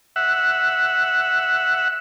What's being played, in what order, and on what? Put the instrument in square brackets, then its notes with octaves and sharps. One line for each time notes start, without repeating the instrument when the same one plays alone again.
[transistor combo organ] E5 F#5